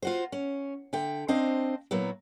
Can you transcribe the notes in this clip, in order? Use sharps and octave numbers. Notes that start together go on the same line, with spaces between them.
F4 F#4 C5
C#4
D3 E5 G5
C4 D4 C5 D#5 F5
A#2 F#3 A#3 B3 E4